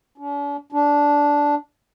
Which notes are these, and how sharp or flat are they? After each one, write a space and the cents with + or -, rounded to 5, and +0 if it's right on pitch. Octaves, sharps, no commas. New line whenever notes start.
D4 -45
D4 -10